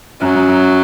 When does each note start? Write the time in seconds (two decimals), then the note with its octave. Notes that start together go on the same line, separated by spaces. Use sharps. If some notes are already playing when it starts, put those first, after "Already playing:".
0.21 F#2 F#3
0.35 F#2
0.49 F#2